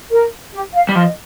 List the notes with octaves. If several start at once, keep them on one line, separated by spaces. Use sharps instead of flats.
A#4
G4
F5
G3
F3 D#5